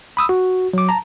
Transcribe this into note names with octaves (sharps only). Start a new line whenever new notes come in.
B5 D#6 E6
F#4
F#3 D6
A5 A#5